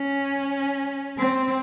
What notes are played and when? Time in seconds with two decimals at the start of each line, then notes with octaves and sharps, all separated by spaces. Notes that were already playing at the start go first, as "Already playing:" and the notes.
Already playing: C#4
1.18 C4